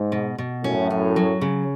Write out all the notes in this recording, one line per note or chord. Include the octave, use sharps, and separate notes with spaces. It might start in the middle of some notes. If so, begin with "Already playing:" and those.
Already playing: G#2
B2
B2
F#2 A2 C#4
C#4
F#3
C#3